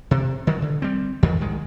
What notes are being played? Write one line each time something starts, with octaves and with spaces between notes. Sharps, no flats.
C3
D#3 F#3
D3
G3 C4
F2 D#3 E3
C2 D#3 G#3